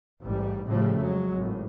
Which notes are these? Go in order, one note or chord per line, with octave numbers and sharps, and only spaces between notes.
A1 G#2 G3
A2 C#3 F3 G3 A3
F2 F#3 G#3
G#1 A2